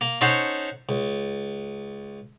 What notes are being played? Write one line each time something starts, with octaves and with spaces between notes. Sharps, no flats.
A#3
C#4 D#4 A4 C5 C#5 F#5
C#2